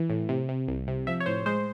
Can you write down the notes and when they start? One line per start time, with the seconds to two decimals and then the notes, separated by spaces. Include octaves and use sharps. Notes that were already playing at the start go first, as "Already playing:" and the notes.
Already playing: E3
0.10 A2
0.29 C3
0.49 C3
0.68 C2
0.88 C3
1.07 F3 E5
1.20 C#5
1.26 A2 C5
1.46 G#3 C5